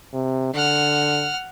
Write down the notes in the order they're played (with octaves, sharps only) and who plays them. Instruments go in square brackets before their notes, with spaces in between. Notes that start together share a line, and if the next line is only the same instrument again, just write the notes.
[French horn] C3
[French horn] D3 [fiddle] F#5 F6